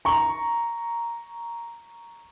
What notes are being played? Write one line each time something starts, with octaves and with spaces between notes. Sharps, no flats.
A#5 C#6